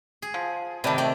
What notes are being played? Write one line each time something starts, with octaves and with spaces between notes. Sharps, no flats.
G#4
F3
C3 D#3 B4 D5 A5
A3 D5 G5